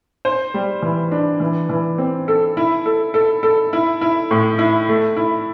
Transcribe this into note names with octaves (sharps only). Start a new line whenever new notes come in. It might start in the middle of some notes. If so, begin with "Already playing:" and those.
C5
G3
E3
D4
E3
E3
C4
A4
E4
A4
A4
A4
E4
E4
A2
E4
A3
E4